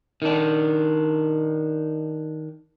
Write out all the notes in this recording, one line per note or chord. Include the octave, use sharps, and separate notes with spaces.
D#3 D4